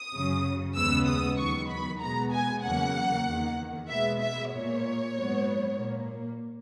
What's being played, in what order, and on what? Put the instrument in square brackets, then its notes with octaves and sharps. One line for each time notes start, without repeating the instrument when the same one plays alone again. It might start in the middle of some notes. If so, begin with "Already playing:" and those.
Already playing: [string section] D#6
F#2 C#3 F#3
D#2 C#3 G#3 B3 E6
D#6
E2 D#3 F#3 B3 C#6
B5
B2 G#3 B3 A#5
G#5
E2 C#3 F#3 A#3 F#5
E2 D#3 A#3
B2 G#3 B3 E5
E5
A#2 A#3 C#5
G#2 F#3 B3
A#2 A#3